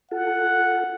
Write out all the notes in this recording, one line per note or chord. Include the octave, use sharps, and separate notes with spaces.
F4 A4 F#5